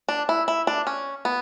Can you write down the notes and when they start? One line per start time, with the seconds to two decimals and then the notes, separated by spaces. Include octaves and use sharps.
0.09 D4
0.29 E4
0.48 E4
0.67 D4
0.87 C#4
1.25 B3